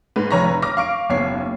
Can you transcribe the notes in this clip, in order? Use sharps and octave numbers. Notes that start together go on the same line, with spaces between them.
G#2 B4
F1 B4 C#5 A#5 C#6 A#6
D6 F6 A#6
F5 C#6 D7
F#1 D#2 B3 C#5 C7